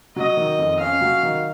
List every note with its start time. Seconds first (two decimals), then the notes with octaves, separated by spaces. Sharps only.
0.16 F#3 D#5
0.37 D#3
0.59 F2
0.80 C#4 F5
1.01 F#3
1.23 D#3